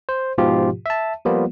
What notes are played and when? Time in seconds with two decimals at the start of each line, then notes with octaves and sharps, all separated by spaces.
0.09 C5
0.38 G#2 B2 F3 F4 G4
0.86 E5 A5
1.25 F3 G3 A#3 B3 F4